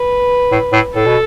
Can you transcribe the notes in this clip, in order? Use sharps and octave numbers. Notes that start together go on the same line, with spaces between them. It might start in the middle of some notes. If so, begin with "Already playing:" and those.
Already playing: B4
A2
A2
A2 A4
B2